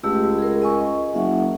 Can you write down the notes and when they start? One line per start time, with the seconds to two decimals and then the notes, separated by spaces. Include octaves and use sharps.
0.04 C#2 A3 G4 E6
0.38 G#4 A#4
0.62 D#5 G#5 C#6
1.14 F#1 E5 F#5